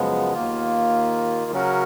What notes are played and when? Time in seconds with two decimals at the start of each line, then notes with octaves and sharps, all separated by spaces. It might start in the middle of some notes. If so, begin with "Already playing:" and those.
Already playing: F#2 C#3 F3 G#3 B3
0.34 D#2 D#3 A#3 F4
1.51 C#3 F#3 C#4 F#4 A#4